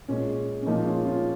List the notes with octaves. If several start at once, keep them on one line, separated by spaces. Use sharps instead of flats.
A#2 G#3 C#4
C#4
A#2 F3 G#3 A#3 D#4
C#4 F4
C#4 F4